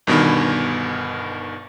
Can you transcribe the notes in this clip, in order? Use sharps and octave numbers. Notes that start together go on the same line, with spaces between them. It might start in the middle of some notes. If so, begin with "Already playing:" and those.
G1 G2 B2 D#3 B5